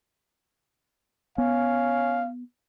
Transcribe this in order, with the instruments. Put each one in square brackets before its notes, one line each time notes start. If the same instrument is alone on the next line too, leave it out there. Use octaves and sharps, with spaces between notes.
[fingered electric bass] B3 [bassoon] C#4 [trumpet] F5